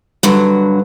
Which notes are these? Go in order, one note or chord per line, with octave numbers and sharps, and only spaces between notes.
G2 D3 F#3